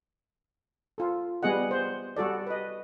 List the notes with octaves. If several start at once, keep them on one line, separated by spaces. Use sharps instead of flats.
F4 A4
G3 B3 G#4 D#5 F#5
C5
G3 F#4 A4 D5
B4 D#5